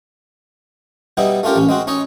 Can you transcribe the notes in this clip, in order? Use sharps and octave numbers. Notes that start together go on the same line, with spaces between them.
B2 G3 B3 D#4 E4
A3 C#4 F4 G4 A#4
A1 C#4
G#3 C4 F#4
C#4 D#4 C#5 D#5